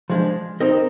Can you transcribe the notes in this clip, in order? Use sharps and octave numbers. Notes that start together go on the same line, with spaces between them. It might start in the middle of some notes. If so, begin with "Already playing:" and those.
F3 G#3 D4
C4 D#4 A#4 D#5